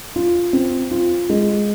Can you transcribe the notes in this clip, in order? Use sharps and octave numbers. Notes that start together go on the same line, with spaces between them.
F4
C4
F4
G#3